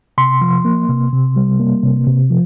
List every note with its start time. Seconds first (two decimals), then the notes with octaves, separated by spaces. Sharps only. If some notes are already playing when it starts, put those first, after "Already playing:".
0.18 C3 C6
0.41 F3
0.65 A#3
0.89 C3
1.13 C3
1.36 G3
1.59 A#3
1.83 C3
2.07 C3
2.30 F3